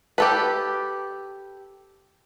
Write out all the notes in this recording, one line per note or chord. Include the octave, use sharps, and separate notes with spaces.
G4 A4 B4